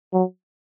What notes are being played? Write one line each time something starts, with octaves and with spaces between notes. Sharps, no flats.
F#3